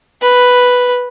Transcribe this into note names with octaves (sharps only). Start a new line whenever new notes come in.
B4